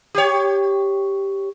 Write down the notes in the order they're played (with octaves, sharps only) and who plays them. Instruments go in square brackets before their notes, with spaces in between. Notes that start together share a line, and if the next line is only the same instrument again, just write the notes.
[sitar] G4 C#5